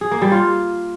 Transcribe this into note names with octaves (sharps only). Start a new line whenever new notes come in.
G#4
A#3
G3
F4